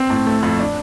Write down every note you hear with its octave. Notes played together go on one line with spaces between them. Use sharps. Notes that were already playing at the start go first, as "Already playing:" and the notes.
Already playing: C4
A2
A3
F2
D4